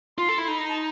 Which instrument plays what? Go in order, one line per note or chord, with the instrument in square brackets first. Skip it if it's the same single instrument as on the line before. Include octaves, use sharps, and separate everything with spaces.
[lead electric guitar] F4 [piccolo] C6
[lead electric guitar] A4
E4
[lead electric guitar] D#4 [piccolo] B5
[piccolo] A#5
A5